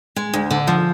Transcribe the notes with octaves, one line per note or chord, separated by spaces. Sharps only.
G#3
D2
D3
F3